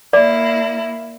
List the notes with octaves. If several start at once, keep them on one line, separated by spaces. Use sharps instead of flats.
A#3 E4 D5